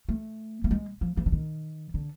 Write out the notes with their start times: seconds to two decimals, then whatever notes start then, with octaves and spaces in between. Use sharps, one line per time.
0.09 A3
0.64 A3
0.71 G#3
1.01 F3
1.17 E3
1.26 D3
1.32 D#3
1.94 D3